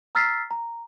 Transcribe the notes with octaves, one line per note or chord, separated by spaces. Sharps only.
A#5 E6 F6 A6 B6 C7
A#5